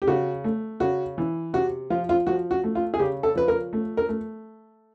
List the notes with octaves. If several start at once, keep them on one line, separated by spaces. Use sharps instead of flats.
G4
C#3 F#4
A3
C#3 F#4
E3
C3 F#4
F3 F4
F4
F3 F#4
F#4
A3
F4
G#4
C#3 G4
A4
F3 B4
A#4
A3
A#4
A3